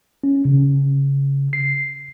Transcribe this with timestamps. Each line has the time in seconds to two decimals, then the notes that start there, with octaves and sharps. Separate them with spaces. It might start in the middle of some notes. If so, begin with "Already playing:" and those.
0.24 C#4
0.45 C#3
1.53 C7